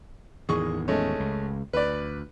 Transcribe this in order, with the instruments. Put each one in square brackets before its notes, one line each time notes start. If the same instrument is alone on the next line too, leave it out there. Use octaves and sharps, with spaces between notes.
[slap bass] E2 A2 D#3 [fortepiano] G#4 C#6
[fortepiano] G#3 A3 C#4
[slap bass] C#2
[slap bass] D2 [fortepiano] B4 D5